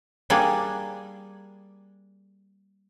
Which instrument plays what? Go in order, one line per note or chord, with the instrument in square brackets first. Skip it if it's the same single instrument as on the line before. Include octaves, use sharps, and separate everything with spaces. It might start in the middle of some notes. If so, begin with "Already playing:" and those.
[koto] G3 A#3 D4 G#4